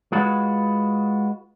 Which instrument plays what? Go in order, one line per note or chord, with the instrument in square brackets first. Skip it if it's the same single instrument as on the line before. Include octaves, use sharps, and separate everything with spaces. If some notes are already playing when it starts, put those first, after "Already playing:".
[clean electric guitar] G#3 F4 F#4 B4